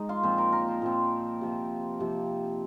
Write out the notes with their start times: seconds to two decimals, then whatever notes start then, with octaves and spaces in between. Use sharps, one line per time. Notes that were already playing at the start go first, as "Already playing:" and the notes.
Already playing: G#3 D#4
0.09 F4
0.23 A#2 F3 C4 C5
0.38 A#4
0.52 A#4
0.68 C5
0.82 A#2 F3 C4
1.41 C3 F3 A#3
1.99 C3 F3 A#3